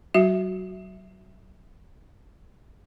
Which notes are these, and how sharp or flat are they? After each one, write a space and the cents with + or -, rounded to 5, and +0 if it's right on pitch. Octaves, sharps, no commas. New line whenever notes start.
F#3 +30 F#4 +0 E5 +0